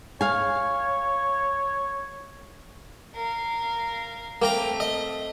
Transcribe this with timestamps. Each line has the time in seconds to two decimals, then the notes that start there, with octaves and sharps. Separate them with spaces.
0.21 C#5 F5 G#5
3.15 A#4 F5
4.42 A3 A#3 C4 G5 A#5
4.80 D#5